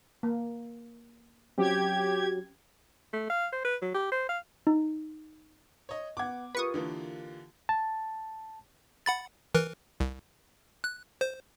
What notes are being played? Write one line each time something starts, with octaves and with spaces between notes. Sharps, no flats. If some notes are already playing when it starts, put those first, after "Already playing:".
A#3
F#3 C4 C#4 G4 G#6
A3
F5
C5
B4
F#3
G4
C5
F5
D#4
C#5 D#5
B3 F#5 D6 G#6
F4 G4 A#4 B4 C#6 D#6
D3 E3 A#3
A5
F#5 B5 A6
E3 A#4 B4
C2
F#6
C5